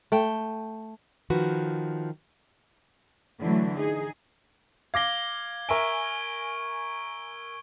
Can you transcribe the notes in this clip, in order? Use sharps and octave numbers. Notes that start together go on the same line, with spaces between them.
A3 G5
D#3 F3 F#4 B4
D3 E3 F#3 A3
D#4 G#4
F5 D6 G#6 A#6 G7
A#4 E5 G#5 C#6 D7